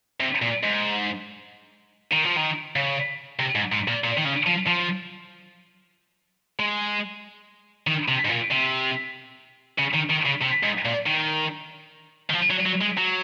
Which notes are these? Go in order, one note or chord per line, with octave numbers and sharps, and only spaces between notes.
C3
A#2
G#2
D#3
F3
D#3
C#3
C3
G#2
G#2
A#2
A#2
D#3
C#3
F3
F3
G#3
D#3
C3
G#2
A#2
C3
C#3
D#3
D#3
C#3
C3
G#2
A#2
D#3
D#3
F3
F#3
F#3
G#3
F#3